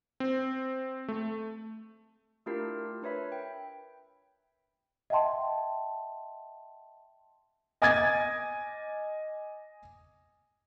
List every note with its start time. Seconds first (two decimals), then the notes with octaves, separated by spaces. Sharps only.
0.20 C4
1.08 A3
2.46 A3 D4 E4 F4 G4 A#4
3.02 D4 A#4 B4 C#5 E5 B5
3.32 G5
5.10 D#5 E5 F#5 G5 A5 C6
7.82 D#5 G#5 D6 D#6 G#6 A6